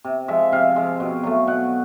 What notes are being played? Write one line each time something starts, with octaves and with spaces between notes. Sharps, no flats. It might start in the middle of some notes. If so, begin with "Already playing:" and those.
C3
F3 G#3 E5
C3 F5
F3 G#3
B2
F#3 A3
B2 F#5